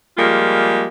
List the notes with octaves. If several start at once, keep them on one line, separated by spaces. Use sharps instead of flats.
F3 G3 G#3 A#3 F4 G#4